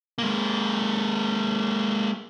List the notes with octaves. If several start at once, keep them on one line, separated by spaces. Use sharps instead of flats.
G#3 A#3